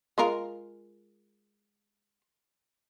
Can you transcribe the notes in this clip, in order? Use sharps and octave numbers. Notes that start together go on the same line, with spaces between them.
G#3 F4 A#4